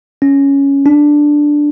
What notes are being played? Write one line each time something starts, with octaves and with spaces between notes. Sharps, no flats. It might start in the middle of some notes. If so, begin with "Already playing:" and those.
C#4
D4